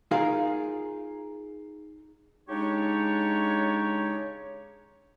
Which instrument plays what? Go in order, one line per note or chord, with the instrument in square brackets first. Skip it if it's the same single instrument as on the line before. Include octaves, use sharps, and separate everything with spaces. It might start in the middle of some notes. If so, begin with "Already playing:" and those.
[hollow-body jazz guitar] D#4 F4 G#4 A#4 F5
[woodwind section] C#3 G#3 D4 D#4 G4 C#5